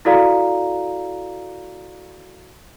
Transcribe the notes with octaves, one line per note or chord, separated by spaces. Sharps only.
E4 F#4 A4 D5 F5 A#5